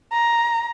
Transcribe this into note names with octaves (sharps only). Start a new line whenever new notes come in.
A#5